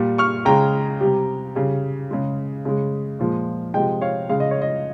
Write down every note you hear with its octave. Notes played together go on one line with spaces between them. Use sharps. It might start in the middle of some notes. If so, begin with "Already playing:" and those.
Already playing: A#2 G3
C#6 F6
C#3 G#3 G5 A#5
C3 G3
C#3 G3
C#3 G#3
C#3 G#3
A#2 F3 G#3
C3 F3 G#3 D#5 G5
C#5 F5
C#3 G#3 F5
D#5
C#5
D#5